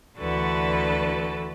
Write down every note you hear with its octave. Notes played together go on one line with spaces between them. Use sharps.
D2 D3 E3 F#4 A4 B4